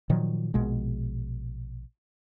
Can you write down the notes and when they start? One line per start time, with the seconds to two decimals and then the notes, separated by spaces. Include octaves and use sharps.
0.10 A#2 D#3 F3 F#3
0.54 A#1 B2 G#3